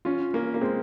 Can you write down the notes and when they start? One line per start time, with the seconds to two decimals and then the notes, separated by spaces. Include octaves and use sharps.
0.05 C#4 F4
0.34 A#3 C#4
0.54 A#3
0.61 G#3 C4